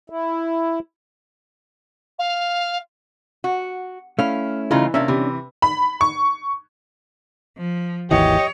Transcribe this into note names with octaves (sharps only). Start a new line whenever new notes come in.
E4
F5
F#4
A3 C#4 E4 F5
C#3 E3 D#4 F4
C3 A#3 C#4 D4 E5
C3 E3
B5
C#6
F3
G#1 D#2 E3 G4 C#5 D#5